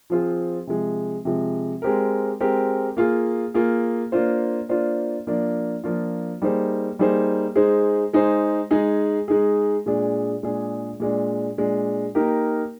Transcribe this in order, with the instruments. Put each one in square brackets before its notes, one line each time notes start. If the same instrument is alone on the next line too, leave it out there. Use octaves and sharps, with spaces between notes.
[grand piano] F3 C4 F4 G#4 C5
C3 F3 G#3
C3 F3 G#3
G#3 C4 G4 A#4
G#3 C4 G4 A#4
A#3 F4 G#4
A#3 F4 G#4
A#3 D4 F4 C5
A#3 D4 F4 C5
F3 A#3 D4 F4
F3 A#3 D4 F4
G3 A#3 D#4 G#4 C5
G3 A#3 D#4 G#4 C5
G#3 D#4 G#4 C5
G#3 D#4 G#4 C5
G#3 D#4 G#4
G#3 D#4 G#4
A#2 G#3 D4 G#4
A#2 G#3 D4 G#4
A#2 G#3 D4
A#2 G#3 D4
A#3 D#4 G4 A#4